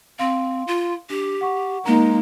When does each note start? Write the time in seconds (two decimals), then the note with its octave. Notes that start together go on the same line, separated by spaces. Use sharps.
0.19 C4 F5 C6
0.67 F4
1.10 D4 G4
1.41 F#5 C#6
1.85 G#3 A#3 D#4 A#5